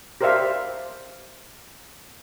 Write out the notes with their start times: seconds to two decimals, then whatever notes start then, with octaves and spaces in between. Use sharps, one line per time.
0.21 G4 A#4 C5 D5 E5 F5